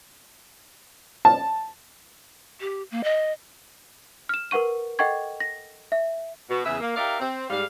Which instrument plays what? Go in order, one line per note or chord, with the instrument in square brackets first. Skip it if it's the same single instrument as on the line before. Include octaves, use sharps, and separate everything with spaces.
[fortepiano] A5
[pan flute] G4
A#3
D#5
[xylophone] F6 E7
A#4 B4 F#5 C#6 D#7
A4 D#5 F#5 G5 C#6 G#6
A#6
E5
[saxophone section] B2
E2 C#3 G#4 B4 E5
A#3
D#4 G4 A#4 D5 E5 F5
C4
G#2 G3 F5